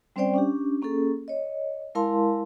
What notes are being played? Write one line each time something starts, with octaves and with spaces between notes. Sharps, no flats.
G3 C4 C#4 C5 D5 G5
C#4 D4 G4
A#3 C#4 G#4 A4
C#5 D#5
G#3 E4 A#4 F5 A5 C6